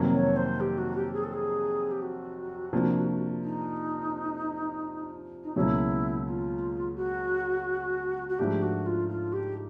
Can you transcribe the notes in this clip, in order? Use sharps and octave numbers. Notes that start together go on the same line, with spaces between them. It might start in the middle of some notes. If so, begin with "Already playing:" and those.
Already playing: F2 C3 D#3 F#3 A#3
C#5
C5
G4
F#4
G4
G#4
A4
G#4
G4
F#4
C3 F3 A#3 D4
D#4
D#4
C#2 B2 F#3 A#3 C#4 E4
F4
F#4
F#4
G#2 F3 A3 D4 G4
F#4
F4
F4
G4